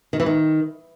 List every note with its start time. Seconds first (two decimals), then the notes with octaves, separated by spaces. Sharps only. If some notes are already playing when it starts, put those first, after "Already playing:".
0.13 D#3
0.20 E3
0.26 D#3